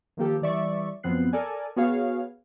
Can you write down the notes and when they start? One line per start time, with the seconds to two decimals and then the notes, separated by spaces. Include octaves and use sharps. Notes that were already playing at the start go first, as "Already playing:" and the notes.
0.17 D#3 F3 A#3 G4 A4
0.42 E3 G3 D5 E5 C#6
1.03 F#2 F3 B3 C4 F#6 C7
1.33 A4 A#4 D5 G#5
1.76 B3 F#4 G#4 C#5 F5